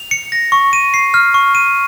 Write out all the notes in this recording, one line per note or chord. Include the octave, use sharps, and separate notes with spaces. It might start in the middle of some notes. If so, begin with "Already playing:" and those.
Already playing: F7
C#7
A#6
C#6
D#7
C7
F6
C#6
D#7